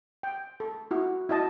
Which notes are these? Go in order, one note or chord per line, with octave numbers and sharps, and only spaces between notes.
G5
A4
E4 F#4
E4 F#4 D#5 A5